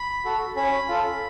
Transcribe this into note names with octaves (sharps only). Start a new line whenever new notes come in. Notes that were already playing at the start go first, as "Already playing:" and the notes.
Already playing: B5
F#4 A4
C#4 B5
F4 A4